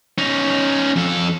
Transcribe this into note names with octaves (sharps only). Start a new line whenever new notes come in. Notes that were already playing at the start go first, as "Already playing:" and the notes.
C#4 D#4
F2 A4